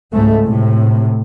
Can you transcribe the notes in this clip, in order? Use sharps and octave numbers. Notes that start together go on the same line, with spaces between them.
C#2 G#2 G#3 A3
A2 C3